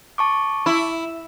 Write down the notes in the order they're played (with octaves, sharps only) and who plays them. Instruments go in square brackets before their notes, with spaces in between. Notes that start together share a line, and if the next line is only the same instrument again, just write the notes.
[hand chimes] A5 C#6 D6
[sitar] E4